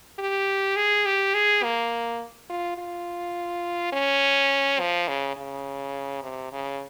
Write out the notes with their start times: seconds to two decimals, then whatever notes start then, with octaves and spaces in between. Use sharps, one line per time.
0.19 G4
0.76 G#4
1.06 G4
1.34 G#4
1.63 A#3
2.50 F4
2.78 F4
3.93 C#4
4.80 F3
5.08 C#3
5.37 C#3
6.23 C3
6.53 C#3